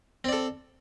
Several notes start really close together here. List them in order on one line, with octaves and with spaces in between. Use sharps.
C4 D5 A4